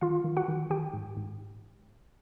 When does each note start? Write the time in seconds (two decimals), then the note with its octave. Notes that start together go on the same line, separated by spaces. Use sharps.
0.01 D#3 F4 F5
0.24 D#3
0.37 F#4 F#5
0.48 D#3
0.70 D#3 G4 G5
0.93 G#2
1.17 G#2